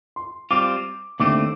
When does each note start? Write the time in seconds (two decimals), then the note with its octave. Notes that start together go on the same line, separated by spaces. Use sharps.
0.16 C6
0.51 G3 C4 F4 D6
1.20 D#2 D3 A3 C4 D6